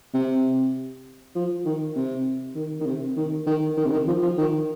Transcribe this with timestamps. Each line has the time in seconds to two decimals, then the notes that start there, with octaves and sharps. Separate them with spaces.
0.14 C3
1.35 F3
1.65 D#3
1.96 C3
2.55 D#3
2.80 D#3
2.86 C3
3.16 D#3
3.46 D#3
3.77 D#3
3.86 C3
3.92 D#3
4.07 F3
4.22 F3
4.38 D#3